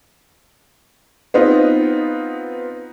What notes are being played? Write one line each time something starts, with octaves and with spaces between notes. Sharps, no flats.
B3 C4 D#4 F4